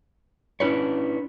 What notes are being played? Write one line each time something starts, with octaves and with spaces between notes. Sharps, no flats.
C#4 D4 E4 B4 C#5